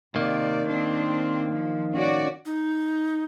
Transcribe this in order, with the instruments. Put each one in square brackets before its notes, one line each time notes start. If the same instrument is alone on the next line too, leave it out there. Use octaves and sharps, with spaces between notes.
[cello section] C3 D5 [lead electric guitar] D#3 A#3
[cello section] C4 D4
F3
C#4 F#4 D5
[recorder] D#4